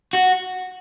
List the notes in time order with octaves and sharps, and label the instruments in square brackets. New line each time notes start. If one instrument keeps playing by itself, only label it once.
[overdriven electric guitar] F#4